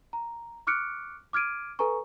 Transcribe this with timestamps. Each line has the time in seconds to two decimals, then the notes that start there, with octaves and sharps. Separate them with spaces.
0.13 A#5
0.67 C#6 D6 F6 F#6 C#7 D7
1.33 D6 F6 G#6 D7 D#7
1.79 A4 B4 G#5 A#5 C#6